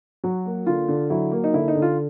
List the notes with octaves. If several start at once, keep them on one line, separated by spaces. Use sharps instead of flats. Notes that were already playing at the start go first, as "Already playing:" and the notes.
F#3 F#4
A#3
D3 F4
D3
F#3 E4
A#3
D#4
D3 E4
D#4
D3
F4